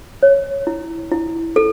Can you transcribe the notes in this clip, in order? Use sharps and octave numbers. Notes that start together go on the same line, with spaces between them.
C#5
E4
E4
A4